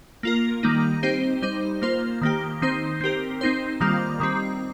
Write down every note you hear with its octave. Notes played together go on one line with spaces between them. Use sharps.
A#3 F4 A#4
D#3 G3 A#3 D#4
C4 D#4 G4 C5
G3 D#4 C5
A#3 F4 C5
D#3 A#3 G4
D#3 C4 D#4 C5
C4 G4 A#4
C4 D#4 C5
D#3 G3 A#3 F4
D#3 G3 C4